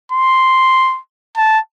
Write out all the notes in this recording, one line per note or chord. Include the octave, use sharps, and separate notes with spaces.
C6
A5